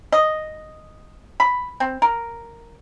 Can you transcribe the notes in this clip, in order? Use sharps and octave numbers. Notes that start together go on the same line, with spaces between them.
D#5
B5
C4
A#4